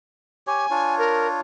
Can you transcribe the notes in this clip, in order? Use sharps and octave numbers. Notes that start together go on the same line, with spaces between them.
G4 C#5 G#5
D4 F4 C#5
A#4